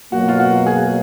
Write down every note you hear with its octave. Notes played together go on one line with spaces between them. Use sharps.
B2 F#3 A#3 F#4
F4
F#4
G#4